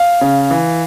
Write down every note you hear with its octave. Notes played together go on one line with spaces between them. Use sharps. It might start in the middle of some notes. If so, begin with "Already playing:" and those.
Already playing: F5
C#3
E3